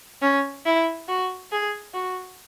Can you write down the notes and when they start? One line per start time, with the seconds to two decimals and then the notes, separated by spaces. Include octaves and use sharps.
0.22 C#4
0.66 E4
1.08 F#4
1.52 G#4
1.94 F#4